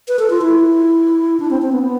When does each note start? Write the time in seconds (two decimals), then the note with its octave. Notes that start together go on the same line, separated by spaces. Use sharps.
0.08 B4
0.19 A4
0.30 F4
0.42 E4
1.40 D4
1.51 C4
1.62 C4
1.72 B3
1.83 B3